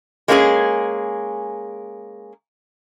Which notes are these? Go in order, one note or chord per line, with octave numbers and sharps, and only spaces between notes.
G#3 A#3 C#4 E4 G#4